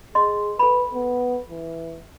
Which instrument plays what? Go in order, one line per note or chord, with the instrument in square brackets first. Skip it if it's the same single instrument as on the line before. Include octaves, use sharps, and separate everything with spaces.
[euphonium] G#4 [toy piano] D#5 C6
[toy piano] A4 B5 [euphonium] B4
[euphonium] B3
E3